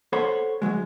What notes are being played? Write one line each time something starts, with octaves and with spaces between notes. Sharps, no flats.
A4 C5 C#5 F#5 B5
D2 G#2 F#3 G#3